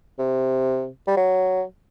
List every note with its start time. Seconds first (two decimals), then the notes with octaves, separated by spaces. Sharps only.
0.19 C3
1.07 G3
1.17 F#3